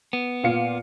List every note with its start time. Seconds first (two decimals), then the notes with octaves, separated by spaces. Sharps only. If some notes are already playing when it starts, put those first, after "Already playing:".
0.13 B3
0.43 A#2 F5 C#7